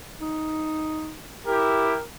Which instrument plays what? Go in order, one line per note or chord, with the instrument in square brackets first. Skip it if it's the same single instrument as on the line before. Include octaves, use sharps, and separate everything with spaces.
[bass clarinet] D#4
[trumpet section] E4 G4 [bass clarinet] A#4